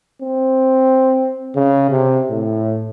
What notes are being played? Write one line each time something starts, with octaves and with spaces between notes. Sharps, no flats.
C4
C#3
C3
A2